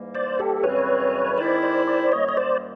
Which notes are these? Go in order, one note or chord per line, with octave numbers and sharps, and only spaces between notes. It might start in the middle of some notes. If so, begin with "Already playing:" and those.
Already playing: G#2 E3 G3 A#3
C5 D5
G4 A4
F#2 C#3 E3 G3 C4 B4 C#5
D#3 G#3 C4 E4 C5 D5
C5 D5
C5 D5
F#2 D#3 G3 A#3 C#5 D#5
D#5
C5 D5